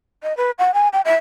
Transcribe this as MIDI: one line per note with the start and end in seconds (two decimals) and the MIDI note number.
0.23 0.36 75
0.37 0.51 71
0.58 0.74 78
0.74 0.88 80
0.93 1.01 79
1.05 1.16 76